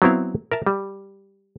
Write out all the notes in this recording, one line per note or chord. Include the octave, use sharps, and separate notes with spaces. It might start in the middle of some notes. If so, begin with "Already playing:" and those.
F#3 B3 C4 E4 F5
A#4 E5 A5
G3